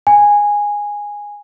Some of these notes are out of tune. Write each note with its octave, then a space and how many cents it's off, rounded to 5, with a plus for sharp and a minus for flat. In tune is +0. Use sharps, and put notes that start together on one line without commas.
G#5 -10